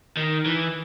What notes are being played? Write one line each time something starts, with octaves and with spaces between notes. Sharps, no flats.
D#3
E3